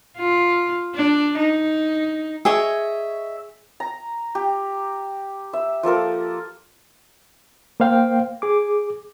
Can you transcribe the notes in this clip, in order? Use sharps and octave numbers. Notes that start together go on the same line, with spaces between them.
F4
D4
D#4
G#4 C#5 D#5 E5
A#5
G4
E5
F3 A#3 A4 A#4
A#3 C5 F5 G5
G#4 D6